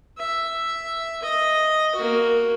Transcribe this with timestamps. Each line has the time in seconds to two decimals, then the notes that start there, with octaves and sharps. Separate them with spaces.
0.18 E5
1.22 D#5
1.95 A#3 F#4